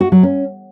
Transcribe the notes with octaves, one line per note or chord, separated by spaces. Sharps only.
F#4
F#3
C#4